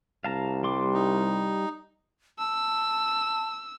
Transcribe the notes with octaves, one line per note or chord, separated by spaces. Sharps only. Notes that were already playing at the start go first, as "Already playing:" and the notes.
C2 F5 A5 A#5
G3 C6 D6
D#4
A5 E6